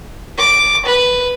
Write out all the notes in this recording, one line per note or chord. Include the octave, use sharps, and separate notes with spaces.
D6
B4